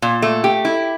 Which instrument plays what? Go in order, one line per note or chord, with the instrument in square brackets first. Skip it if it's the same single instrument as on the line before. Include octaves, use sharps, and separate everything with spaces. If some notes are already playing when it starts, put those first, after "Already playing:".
[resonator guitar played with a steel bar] A#2
A3
G4
E4